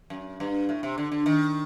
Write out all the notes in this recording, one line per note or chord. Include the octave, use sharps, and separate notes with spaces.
F#2
G2
A2
C3
D3
D3
D#3